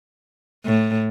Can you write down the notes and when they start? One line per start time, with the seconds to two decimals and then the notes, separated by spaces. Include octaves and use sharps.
0.65 A2